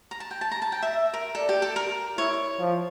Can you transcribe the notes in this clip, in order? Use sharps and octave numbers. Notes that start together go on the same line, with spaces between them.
A#5
A5
G5
A5
A#5
A5
G5
E5
E5
A#4
A4 D5
G4
A4
A#4
E4 C#5
F3